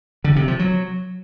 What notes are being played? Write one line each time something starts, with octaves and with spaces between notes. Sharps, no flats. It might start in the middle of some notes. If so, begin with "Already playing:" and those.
D3
C3
F3
F#3